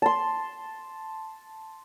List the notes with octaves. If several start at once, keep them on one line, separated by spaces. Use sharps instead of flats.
A5 C6